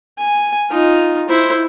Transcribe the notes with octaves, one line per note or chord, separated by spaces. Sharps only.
G#5
D#4 F4
E4 C5